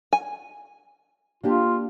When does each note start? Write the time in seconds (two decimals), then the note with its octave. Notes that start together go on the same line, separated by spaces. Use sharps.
0.13 G#5
1.43 A#3 D4 F4 G4